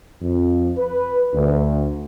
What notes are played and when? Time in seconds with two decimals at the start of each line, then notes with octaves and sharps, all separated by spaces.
0.22 F2
0.78 B4
1.34 D2